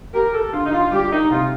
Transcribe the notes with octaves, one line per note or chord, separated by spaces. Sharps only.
G4 A#4
A4
D3 F4
D#4
F4
G3 G4
D#4
C3 F4